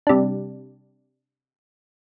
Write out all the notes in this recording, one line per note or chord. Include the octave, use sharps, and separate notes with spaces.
C3 G3 D4